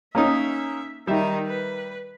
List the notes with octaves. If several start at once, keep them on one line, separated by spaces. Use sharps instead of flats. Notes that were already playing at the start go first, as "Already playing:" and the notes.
A#3 C#4 D#4 E5
D#3 G3 D#4 E5
B4